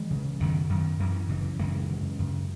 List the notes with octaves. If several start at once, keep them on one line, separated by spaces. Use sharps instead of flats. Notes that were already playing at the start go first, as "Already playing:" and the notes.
Already playing: E3 G#3
C#3
F#2 D#3 F#3
F#2 D#3
F#2 E3
C#3 E3
F#2 E3 G#3
C#3
F#2